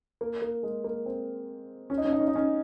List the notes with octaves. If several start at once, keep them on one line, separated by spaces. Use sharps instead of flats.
A#3
A#3
G#3
A#3
C4
C#4
D#4
C#4
D#4
C#4
D#4
C#4